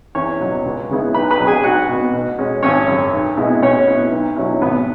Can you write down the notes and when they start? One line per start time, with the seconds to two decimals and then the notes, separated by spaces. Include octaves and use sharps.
0.15 E2 C#4 C#5
0.40 B2 F#3
0.66 C#2
0.90 C#3 G#3 B3 E4
1.14 B1 B4 B5
1.31 B4 B5
1.39 B2 F#3
1.47 G#4 G#5
1.64 B1 F#4 F#5
1.89 B2 B3
2.13 B2
2.38 G#3 C#4
2.63 G#1 C#4 C#5
2.88 F#2 C#3
3.13 B1
3.37 B2 G#3 B3 E4
3.62 B2 C#4 C#5
3.87 B3 E4
4.12 B1
4.37 B2 F#3 C#4 E4
4.61 G#1 B3 B4